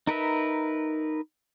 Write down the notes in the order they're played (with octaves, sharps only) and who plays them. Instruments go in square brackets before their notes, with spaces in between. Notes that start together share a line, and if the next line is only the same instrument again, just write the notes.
[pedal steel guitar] D#4 A#4 B4 E5